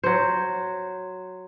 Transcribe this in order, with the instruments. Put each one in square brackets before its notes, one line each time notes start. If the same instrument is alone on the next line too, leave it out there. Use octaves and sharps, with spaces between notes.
[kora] F#3 C5